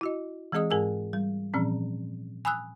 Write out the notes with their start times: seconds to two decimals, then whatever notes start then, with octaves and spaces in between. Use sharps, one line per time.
0.01 E4 F#4 D#5
0.52 E3 G#3 C4 G#4 D#5 D#6
0.70 G#2 G#3 G#4 A#4 G#5 E6
1.13 G3
1.54 A#2 E3 F3 C4 C#4
2.45 G#5 B5 D#6 E6 F#6